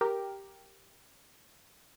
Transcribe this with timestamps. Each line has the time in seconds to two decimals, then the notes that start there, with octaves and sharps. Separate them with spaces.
0.01 G4 A#4